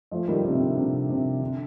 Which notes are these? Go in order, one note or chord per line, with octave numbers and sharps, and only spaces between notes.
F3 A3
D#3 G3
C3 D#3
C3
D3
C3
C3
D3